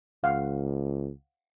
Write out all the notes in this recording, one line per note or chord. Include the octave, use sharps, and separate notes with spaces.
C#2 F5 F#5